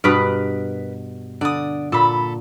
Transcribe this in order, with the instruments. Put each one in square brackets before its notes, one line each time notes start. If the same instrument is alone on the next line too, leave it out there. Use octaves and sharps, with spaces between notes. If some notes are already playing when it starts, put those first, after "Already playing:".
[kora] G2 B2 [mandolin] A#4 B4 D#6
[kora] D3 [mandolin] D5 D#6
[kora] A#2 [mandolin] A4 B5